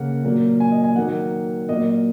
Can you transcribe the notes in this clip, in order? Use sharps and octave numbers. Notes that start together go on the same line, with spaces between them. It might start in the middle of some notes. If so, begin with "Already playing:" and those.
Already playing: C#3 A#3 F#5
A#2 F#3 A#3
G#5
D#5
G#5
D#3 F#3 A#3 F#5
A#2 F#3 A#3 D#5